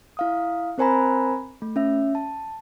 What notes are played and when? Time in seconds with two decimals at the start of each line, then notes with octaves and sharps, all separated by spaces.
0.17 E4 F5 D#6
0.78 C4 A#4 C5 G#5 A#5 B5
1.62 A3
1.76 C#4 E5
2.15 A5